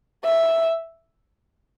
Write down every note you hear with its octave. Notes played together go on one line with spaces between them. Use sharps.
E5